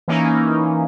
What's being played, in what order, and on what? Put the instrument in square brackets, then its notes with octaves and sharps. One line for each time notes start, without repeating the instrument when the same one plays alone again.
[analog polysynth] E3 A#3 C#4 D#4